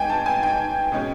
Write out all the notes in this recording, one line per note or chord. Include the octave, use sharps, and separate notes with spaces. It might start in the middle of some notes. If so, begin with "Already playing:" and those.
Already playing: G#2 G5 G#5
A5
G#5
G5
B2 G#3 C#4